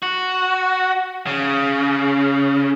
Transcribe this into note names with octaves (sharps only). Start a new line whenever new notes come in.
F#4
C#3